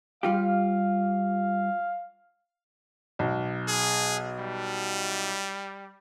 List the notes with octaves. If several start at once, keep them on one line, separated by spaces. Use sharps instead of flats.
G3 F4 G4 F5
B1
G#4
G3